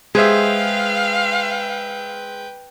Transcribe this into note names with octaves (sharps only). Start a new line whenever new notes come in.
G#3 G#4 B4 C5 E5 F5 G5